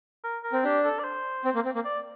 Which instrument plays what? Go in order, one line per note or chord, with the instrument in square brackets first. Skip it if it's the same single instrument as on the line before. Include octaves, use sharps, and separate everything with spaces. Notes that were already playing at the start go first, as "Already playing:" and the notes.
[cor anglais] A#4
A#4
[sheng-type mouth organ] C4
[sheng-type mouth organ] D4 [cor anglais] G4
[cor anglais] A4
D5
C5
[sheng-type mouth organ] C4
A#3
C4
A#3
[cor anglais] D5